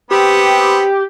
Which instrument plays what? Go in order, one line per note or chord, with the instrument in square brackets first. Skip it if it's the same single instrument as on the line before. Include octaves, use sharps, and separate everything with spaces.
[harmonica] B3 C4 [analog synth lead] G4